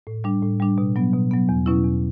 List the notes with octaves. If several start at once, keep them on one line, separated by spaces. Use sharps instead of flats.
A2
G3 D4
A2
G3 D4
B2
F#3 B3
B2
F#3 B3
E2
B2 F#3 C#4 E4
E2